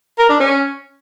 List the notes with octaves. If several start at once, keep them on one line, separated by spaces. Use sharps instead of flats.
A#4
D4
C#4